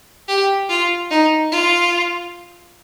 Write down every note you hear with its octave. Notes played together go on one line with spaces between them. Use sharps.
G4
F4
D#4
F4